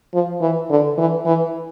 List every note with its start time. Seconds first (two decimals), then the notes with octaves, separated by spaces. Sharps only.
0.14 F3
0.41 E3
0.70 D3
0.98 E3
1.26 E3